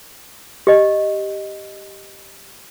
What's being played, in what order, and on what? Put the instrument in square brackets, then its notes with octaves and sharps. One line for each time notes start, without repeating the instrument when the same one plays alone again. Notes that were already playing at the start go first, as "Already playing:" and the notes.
[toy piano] G4 D#5